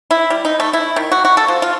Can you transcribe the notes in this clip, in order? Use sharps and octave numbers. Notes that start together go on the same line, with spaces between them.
E4
G3
D#4
A3
E4
D#3
F#4
F#4
A4
F3
F4